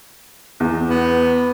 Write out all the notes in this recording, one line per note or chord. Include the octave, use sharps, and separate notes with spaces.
E2
B3